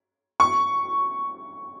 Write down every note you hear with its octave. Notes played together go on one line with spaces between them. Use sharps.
C#6